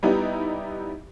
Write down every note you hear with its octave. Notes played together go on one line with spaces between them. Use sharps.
G3 B3 D#4 E4 G4